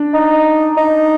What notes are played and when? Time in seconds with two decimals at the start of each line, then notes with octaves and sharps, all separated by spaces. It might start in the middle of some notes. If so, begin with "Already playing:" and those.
Already playing: D4
0.14 D#4
0.77 D#4